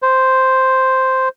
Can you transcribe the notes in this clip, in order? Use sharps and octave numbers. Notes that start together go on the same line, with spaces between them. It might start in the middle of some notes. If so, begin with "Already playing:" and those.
C5